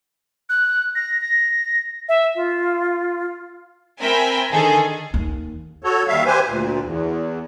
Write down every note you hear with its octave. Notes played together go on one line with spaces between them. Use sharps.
F#6
A#6
A#6
E5
F4
C4 A#4 E5 G5 G#5 B5
D3 D#3 G#4 A4
D#2
F#4 A4 C#5
D#2 G3 E5 F5
G4 B4 C5 G#5
D2 A#2
E2